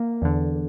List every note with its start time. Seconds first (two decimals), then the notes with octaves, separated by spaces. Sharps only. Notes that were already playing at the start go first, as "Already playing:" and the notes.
Already playing: A#3
0.22 E2 D3